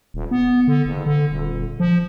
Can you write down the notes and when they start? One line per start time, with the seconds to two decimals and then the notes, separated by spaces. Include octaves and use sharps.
0.14 D#1
0.31 B3
0.68 D3
0.86 F#1
1.06 D3
1.30 D#1
1.80 F3